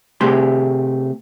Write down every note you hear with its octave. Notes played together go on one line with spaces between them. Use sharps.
C3 A3 G4 G#4 C6